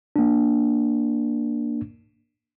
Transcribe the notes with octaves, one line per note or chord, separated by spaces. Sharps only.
A#3 D4